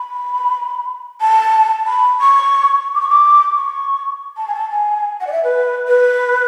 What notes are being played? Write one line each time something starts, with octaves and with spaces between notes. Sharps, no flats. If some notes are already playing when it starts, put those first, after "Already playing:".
Already playing: B5
A5
B5
C#6
D6
C#6
D6
C#6
A5
G#5
A5
G#5
F#5
D5
E5
B4
B4